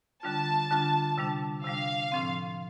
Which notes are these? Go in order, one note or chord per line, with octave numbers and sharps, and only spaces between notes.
D3 G3 D4 F4 A5
D3 G3 D4 F4
C3 G3 D4
C3 G3 D4 F5
A2 F3 C4